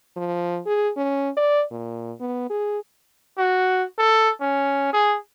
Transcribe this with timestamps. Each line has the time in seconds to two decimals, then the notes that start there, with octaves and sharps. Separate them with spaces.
0.16 F3
0.66 G#4
0.97 C#4
1.37 D5
1.71 A#2
2.20 B3
2.50 G#4
3.38 F#4
3.99 A4
4.41 C#4
4.93 G#4